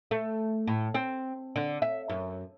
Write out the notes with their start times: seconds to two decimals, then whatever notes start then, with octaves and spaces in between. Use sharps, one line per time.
0.11 A3
0.67 A2
0.94 C4
1.56 D3
1.82 E5
2.09 F#2